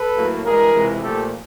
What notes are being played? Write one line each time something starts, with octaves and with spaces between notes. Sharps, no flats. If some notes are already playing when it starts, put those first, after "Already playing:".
Already playing: A4 B4
A2 F#3 A#3
G2 E3 G#3 G#4 A#4
C#2 C3 E3 G#3
A#2 F3 A3 G4 A4